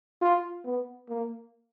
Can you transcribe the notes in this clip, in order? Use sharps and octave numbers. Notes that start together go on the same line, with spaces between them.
F4
B3
A#3